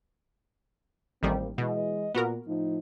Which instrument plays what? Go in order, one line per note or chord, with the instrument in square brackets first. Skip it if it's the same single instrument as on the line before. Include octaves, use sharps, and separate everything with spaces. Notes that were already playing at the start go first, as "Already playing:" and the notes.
[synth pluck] A1 D#3 G3 [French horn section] A#3 C4
[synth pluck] B2 [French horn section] E3 G#3 D#5
[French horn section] A#2 [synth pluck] B3 F#4 A#4
[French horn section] A2 F3 D#4